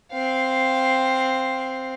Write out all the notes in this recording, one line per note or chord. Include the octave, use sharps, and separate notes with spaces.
C4 F5